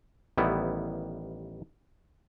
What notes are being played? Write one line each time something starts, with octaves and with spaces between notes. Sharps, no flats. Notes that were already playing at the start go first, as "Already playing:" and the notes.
A1 D#3 G3 B3 E4